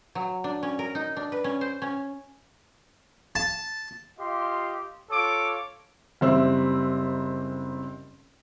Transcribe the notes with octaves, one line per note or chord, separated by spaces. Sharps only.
F#3
D4
C#4
A#4
D#4
D4
B4
C#4
C5
C#4
A5
F4 G4 D#5 C6
F4 A4 C#5 D6
F#1 G3 C4 E5 E6